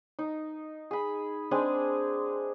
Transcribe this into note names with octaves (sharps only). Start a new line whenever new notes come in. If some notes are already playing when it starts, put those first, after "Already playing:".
D#4
G#4 B5
G#3 C4 D4 G#4